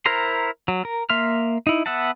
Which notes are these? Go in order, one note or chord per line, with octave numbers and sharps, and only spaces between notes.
E4 A#4 C5 A#5 C6
F#3
A#4
A#3 E5 C6 F6
D#4 E4
B3 E5 F#5 A5